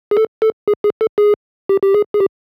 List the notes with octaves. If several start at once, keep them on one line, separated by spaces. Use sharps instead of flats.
G#4
A4
A4
G#4
G#4
A4
G#4
G4
G4
G#4
G#4
G4